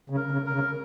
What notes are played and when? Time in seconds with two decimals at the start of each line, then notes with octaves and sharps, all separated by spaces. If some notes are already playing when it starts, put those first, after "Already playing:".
0.10 C#3
0.17 A#4
0.31 C#3
0.46 A#4
0.53 C#3